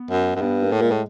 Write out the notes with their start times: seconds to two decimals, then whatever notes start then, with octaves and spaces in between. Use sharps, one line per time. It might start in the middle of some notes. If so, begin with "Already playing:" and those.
Already playing: B3
0.11 F#2
0.35 F#2
0.41 G2 B3
0.63 A#3
0.72 A2
0.81 A#2 G#3
0.91 A2